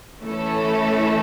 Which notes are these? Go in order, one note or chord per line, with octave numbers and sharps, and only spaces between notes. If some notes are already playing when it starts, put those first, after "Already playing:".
E3 A3 C#4 E4 A4